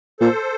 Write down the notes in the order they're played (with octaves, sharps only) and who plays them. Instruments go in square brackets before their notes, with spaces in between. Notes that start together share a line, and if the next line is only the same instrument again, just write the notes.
[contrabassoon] A#2 [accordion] A4 C5